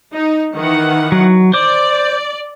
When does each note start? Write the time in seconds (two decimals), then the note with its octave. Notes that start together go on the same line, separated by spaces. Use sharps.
0.13 D#4
0.56 D#3 E3 F#5
1.12 F#3
1.54 C5 D5 D6